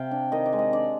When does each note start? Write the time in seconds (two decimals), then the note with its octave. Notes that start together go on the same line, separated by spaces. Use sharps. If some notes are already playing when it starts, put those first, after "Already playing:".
Already playing: C3 F5 G5
0.11 D4
0.32 D#3 D#5
0.46 D5
0.53 G#3
0.59 D#5
0.73 D4 D5